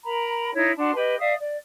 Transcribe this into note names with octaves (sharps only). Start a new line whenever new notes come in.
A#4 A#5 B5
D#4 E4 C#5
D4 F#4 A5 C6
G4 B4 D#5
D5 E5 F5 D#6
D5